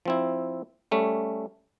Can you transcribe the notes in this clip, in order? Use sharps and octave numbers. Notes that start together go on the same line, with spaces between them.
F3 C4 E4
G3 A3 C#4